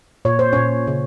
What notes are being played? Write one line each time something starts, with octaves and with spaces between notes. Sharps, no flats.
A#2 C#5
C5
A#2 C#4 C#5
C#3